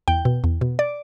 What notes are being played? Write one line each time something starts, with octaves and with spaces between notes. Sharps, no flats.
E2 G5
B2
E2
B2
D5